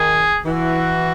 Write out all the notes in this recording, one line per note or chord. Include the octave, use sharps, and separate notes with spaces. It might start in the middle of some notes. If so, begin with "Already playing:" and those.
Already playing: D#3 G#4
E3 F#4